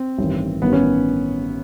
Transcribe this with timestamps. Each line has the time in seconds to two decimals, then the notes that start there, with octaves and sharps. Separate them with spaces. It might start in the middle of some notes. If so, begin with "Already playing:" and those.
Already playing: C4
0.18 A1 G2 D#3
0.62 A1 G2 D#3 B3
0.73 C#4